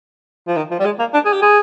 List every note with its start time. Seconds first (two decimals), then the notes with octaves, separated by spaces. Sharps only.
0.47 F3
0.57 D#3
0.71 F3
0.79 G3
0.85 G#3
0.99 A#3
1.14 D4
1.25 G#4
1.33 G4
1.42 G#4